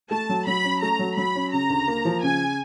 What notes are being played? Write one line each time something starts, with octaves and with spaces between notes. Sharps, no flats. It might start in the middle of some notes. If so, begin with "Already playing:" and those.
A3 A5
F#3
F#3 B5
C#4
A3 A#5
F#3
F#3 B5
C#4
C#3 A#5
D2
A#3
F3
C#3 G#5